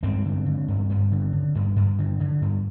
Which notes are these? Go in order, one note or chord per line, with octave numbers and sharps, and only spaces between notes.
G2 G#3 C4
D3
D3
G2
G2
D3
D3
G2
G2
D3
D3
G2